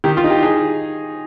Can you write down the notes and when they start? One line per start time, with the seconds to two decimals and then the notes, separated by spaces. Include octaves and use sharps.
0.04 D#3 G4
0.17 F4
0.24 D#4
0.30 G4
0.43 D#4 G#4